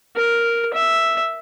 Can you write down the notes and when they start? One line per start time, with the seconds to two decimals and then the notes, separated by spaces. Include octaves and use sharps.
0.16 A#4
0.73 E5